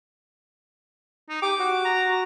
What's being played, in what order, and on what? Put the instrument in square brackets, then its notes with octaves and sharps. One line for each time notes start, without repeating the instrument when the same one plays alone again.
[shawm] D#4
[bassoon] G4 [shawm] D6
[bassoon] F#4
[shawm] A#5